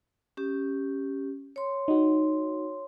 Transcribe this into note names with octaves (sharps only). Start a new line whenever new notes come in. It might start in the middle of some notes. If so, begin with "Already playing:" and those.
C#4 G4
C#5 C6
D#4 F#4